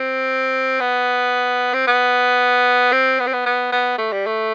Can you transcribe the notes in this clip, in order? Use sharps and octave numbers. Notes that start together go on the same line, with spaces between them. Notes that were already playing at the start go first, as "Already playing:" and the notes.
Already playing: C4
B3
C4
B3
C4
B3
C4
B3
B3
B3
A3
G3
A3